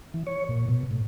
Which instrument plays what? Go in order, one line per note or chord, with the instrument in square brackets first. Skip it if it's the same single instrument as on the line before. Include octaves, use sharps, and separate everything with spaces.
[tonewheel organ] E3
C#5
A#2
B2
A2